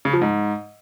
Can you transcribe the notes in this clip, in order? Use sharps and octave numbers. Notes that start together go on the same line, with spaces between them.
C#3
F3
G#2